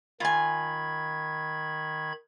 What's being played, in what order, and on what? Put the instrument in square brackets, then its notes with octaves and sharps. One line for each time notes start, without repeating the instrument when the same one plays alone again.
[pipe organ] D#3 B5 G#6 [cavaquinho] F4 G#5